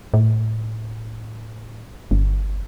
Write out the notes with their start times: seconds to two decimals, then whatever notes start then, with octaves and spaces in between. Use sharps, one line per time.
0.14 A2
2.11 G1